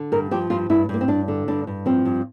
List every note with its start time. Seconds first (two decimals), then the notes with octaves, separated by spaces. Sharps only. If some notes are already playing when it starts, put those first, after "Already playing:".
Already playing: D3
0.12 G2 A#4
0.31 F3 G4
0.50 G2 F4
0.70 G2 E4
0.89 G2 A#3
1.01 C4
1.08 G2 D4
1.28 D3
1.48 G2 D4
1.67 G2
1.86 F3 C4
2.05 G2